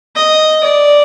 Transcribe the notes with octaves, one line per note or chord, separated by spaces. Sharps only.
D#5
D5